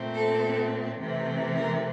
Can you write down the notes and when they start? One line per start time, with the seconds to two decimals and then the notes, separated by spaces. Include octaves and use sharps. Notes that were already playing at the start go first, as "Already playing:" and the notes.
Already playing: A#2 A3 C4
0.13 A4
0.98 C3 E3 A3 C4
1.55 A#4